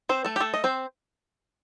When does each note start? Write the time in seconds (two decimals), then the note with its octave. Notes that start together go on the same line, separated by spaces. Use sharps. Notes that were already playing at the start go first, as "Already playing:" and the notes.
0.09 C4 C5
0.25 A3 A4
0.36 G4
0.40 A3 A4
0.54 D#5
0.64 C4 C5